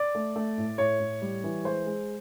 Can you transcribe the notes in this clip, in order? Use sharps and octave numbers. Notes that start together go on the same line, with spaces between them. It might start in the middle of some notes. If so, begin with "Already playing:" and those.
Already playing: D5
A3
A3
A2
A2 C#5
A2
G3
E3
G#3 C5
G#3